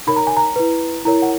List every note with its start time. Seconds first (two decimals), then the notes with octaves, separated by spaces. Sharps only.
0.07 D#4 A#4 C#5 B5
0.16 A#5
0.27 G#5
0.37 A#5
0.56 E4 B4
1.05 E4 A#4 C#5 A#5
1.22 F#5